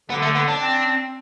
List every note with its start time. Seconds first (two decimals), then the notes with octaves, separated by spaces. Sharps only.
0.10 D3 B3
0.22 A3
0.35 B3
0.48 D4
0.60 C4